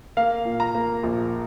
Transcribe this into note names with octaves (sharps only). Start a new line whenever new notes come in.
A#3 F5
A#2
A#5
A#3
A#1